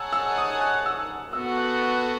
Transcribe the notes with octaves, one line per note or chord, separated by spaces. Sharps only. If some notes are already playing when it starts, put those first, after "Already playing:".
Already playing: D#4 G#4 C#5 F#5 A5 E6
E6
D#6
F#6
E6
B3 F#4 A4 E6
F#6
F#6